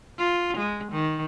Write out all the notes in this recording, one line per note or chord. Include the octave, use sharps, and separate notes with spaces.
F4
G#3
D#3